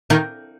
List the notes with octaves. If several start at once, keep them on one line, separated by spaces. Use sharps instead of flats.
D#3